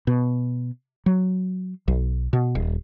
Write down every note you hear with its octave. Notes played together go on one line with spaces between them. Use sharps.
B2
F#3
B1
B2
D#1